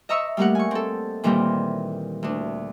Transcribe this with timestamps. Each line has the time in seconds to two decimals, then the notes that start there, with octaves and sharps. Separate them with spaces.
0.09 D#5 E5 A#5 C#6 E6
0.37 G3 A3 A#3 G4 A#4 F#5
0.55 G#5 C#6
0.71 C4 A4
1.24 A#2 D#3 E3 G3 A#3 C4
2.23 D2 D4